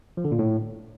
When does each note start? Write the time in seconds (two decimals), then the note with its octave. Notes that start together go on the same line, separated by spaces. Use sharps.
0.17 F3
0.24 D3
0.32 A#2
0.39 A2